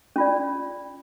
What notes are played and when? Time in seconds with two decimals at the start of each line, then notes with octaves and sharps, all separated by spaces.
0.16 C#4 F4 D5